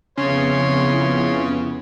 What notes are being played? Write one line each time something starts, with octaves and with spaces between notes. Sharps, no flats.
F2 C#3 B3 E4 C#5 C6